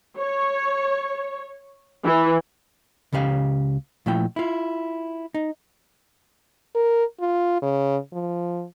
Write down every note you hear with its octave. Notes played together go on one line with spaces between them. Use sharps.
C#5
E3
C#2 C#3 C#4 G4 F5
A#2 F3 A3 E4 G5
E4 F4
D#4
A#4
F4
C#3
F3